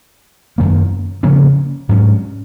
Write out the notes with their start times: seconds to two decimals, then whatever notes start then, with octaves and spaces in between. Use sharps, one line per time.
0.58 F#2 D#3 A#3
1.23 C#3 F3 A#3 C#4
1.89 G#2 F#3 C#4